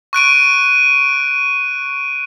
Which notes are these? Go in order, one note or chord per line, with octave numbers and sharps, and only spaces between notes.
C#6 F#6 D7 D#7